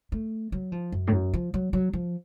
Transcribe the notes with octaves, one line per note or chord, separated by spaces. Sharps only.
A3
F#3
F3
F#2
A2
F#2
F3
F#3
F#3
F3